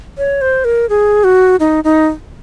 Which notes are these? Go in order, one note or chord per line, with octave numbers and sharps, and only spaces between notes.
C#5
C5
A#4
G#4
F#4
D#4
D#4